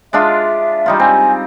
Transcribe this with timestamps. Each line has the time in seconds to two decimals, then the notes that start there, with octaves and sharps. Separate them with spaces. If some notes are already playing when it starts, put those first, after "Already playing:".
0.13 G#3 D4 F4 E5
0.86 G3 D#4 F4
0.99 C4 G#5